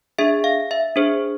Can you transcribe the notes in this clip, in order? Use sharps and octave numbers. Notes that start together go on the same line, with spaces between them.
D4 G#4 E5
F5
E5
D4 G#4 C5